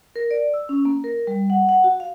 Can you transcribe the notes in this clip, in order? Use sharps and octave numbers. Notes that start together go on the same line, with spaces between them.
A#4
D5
E6
C#4
A#3
A#4
G3
F#5
F#5
F#4
F5